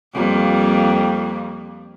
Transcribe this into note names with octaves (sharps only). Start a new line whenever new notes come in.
F2 G3 A#3